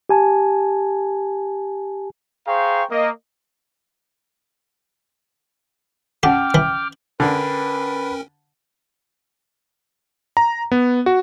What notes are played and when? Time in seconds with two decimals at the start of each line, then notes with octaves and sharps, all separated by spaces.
0.09 G4 G#5 A5
2.47 G#4 C5 F5 G5 A#5 C#6
2.91 A#3 D#5
6.23 C#4 G4 F#5 G5 D6 F6
6.54 E3
7.20 D3 C#4 A#4 B4 G5
10.37 A#5
10.72 B3
11.06 F#4